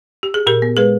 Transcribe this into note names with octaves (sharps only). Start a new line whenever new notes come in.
G4
G#4
A#2 G4 A#4
B3
G#3 G#4 B4